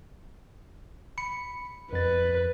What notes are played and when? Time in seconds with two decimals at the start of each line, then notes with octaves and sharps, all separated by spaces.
1.18 B5 C#7
1.93 F2 B4 A6